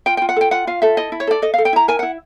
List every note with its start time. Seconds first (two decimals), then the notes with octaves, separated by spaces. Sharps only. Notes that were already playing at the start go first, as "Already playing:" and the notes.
0.06 F4 G5
0.17 F4 G5
0.29 F#5
0.36 A4 G5
0.51 F4 F#5
0.67 F4 F5
0.82 A4 E5
0.97 E4 D#5
1.12 E4
1.20 C#5
1.27 A4 D5
1.42 A4 D#5
1.54 A4 F5
1.65 G5
1.73 E4 A#5
1.88 A#4 G#5
1.99 E4 F#5